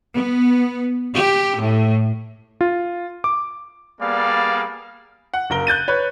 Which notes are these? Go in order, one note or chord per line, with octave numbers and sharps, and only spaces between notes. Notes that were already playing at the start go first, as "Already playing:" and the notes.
B3
G4
A2
F4
D6
G3 A#3 B3 G#4 D5 F5
F#5
F#1 A#4 G7
F#6 G6 A6 D#7
B4 C#5